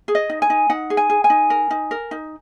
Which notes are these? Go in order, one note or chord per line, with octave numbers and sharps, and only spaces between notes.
G#4
D#5
D#4
G#5
D#4
D#4 F#5
G#4
G#5
G#4
G#5
D#4
A#4
D#4
A#4
D#4